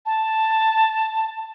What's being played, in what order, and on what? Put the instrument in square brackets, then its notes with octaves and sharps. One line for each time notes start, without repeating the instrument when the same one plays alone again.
[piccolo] A5